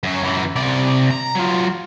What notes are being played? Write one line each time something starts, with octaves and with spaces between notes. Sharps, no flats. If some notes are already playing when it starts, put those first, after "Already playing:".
F#2 F#3
F#2 E3
C3 D5
A#5
F#3 F4